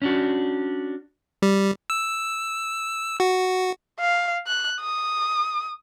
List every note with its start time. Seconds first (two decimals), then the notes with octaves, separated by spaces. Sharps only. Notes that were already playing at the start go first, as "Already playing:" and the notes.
0.02 C#4 D4 F#4
1.42 G3
1.90 E6
3.20 F#4
4.00 F5
4.47 F#6
4.81 D#6